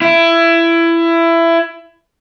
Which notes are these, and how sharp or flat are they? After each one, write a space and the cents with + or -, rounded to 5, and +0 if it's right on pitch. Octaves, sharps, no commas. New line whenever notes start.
E4 +20